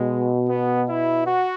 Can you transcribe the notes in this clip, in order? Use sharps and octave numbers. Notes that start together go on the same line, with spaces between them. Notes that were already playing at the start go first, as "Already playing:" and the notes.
Already playing: B2 G#3
B3
E4
F#4